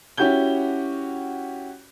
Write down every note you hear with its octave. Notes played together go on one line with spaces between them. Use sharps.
C#4 E4 F#4 G4 G6 G7